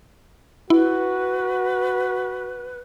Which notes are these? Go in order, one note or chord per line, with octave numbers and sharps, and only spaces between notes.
E4 F#4 B4